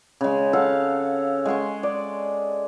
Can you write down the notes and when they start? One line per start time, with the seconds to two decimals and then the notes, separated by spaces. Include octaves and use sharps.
0.21 C#3 G#3
0.53 A4 F5 F#5 A5
1.45 G#3 F#5 C6 C#6
1.83 D5